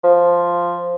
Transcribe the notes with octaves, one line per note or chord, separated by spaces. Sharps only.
F3